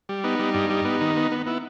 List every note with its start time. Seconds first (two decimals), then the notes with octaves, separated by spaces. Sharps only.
0.09 G3
0.24 B3 D#4
0.39 G3
0.54 G2
0.70 G3
0.85 B3
1.01 D#3
1.17 B3
1.32 B3
1.46 B3 E4